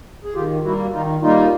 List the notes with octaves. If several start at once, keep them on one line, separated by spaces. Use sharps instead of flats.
G#4
D#3 F4 G4
G3 A#3 E4 F#4
D#3 D#4 F4
G3 A#3 D#4 F4